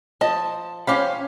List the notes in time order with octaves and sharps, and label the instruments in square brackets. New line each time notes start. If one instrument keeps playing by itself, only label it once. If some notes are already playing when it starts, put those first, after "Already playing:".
[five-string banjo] F3 D#5 [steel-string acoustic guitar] A5
[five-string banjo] F3 G4 B5 [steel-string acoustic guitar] C#4 C#5 F5